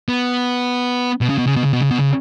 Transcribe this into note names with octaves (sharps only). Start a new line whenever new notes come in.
B3
B2
C#3
B2
C#3
B2
C#3
B2
C#3
B2
C#3